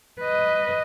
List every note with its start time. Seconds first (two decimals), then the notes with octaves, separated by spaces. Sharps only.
0.20 B4 D#5